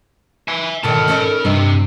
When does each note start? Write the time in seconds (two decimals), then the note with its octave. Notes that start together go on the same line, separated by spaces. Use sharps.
0.48 E5 G#5
0.83 B2 D3 D#3 A#4 A5
1.08 C#4 D#4 A4
1.45 G2 C3 D#5